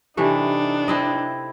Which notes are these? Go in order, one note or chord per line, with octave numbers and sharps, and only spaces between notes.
C3 E3 A3 D4 D#4
C4 E4 D#5